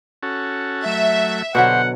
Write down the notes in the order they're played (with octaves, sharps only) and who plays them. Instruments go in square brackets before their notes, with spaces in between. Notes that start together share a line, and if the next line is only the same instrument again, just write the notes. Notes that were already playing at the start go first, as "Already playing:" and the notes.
[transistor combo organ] C#4 F#4 A4
[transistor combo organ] F#3 A3 [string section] E5
[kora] B2 D3 F#3 [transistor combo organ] G4 C5 [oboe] F#5